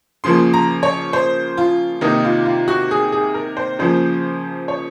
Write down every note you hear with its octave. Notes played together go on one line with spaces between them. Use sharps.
C#3 F3 A#3 C6
A#5
C#5
C5
F4
C3 D#3 A#3 D#4
F4
F4
F#4
G#4
G#4
A#4
C5
C#3 F3 A#3 C5
C#5